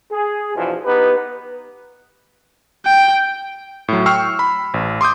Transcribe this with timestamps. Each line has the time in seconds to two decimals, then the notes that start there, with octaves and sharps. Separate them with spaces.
0.11 G#4
0.55 E2 G2 B2 E3 F3
0.85 B3 D#4 G4 B4
2.86 G5
3.88 A2 F#3
4.06 G5 C#6 E6 F6 C7
4.39 B5
4.74 A1
5.01 C6 D6 D#6 G6